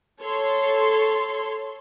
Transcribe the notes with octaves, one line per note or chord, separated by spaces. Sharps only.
A4 C#5 C6